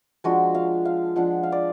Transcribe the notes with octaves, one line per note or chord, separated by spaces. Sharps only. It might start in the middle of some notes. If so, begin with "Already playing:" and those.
F3 G#3 D4 F#4
F5
F5
F3 G#3 D4 F#5
F5
D5